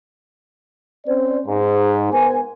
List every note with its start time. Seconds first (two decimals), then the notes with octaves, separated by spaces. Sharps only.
1.07 C4 C#4 C5 D5
1.47 G#2
2.12 B3 A#4 C5 G#5